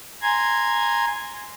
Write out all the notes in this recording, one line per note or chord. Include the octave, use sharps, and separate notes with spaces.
G#5 A#5 C6 G#6